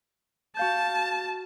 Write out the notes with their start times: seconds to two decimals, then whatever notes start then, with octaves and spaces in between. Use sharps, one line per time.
0.57 F#4 F5 A5 G6